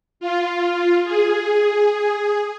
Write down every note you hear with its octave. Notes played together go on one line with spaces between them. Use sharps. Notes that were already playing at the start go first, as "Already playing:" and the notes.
F4
G#4